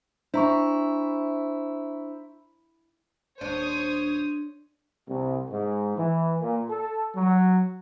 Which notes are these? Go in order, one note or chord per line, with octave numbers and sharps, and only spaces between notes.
D4 E4 C5 E5 A#5 C#6
D#1 D4 C5 C#5 D#6
C2
G#2
E3
A#2
A4
F#3